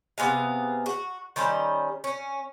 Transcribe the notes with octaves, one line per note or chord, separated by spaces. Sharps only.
C3 B3 G#4 F5
F#4
D#3 G3 C#4 C5
C#4